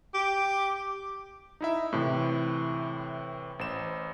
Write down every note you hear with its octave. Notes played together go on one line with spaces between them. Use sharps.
G4
D#4 E4 E5
A2 C3 E3
A1 C5 E7